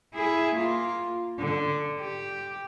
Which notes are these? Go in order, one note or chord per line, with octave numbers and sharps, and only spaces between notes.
E4 G#4
A#3 F4
D3
G4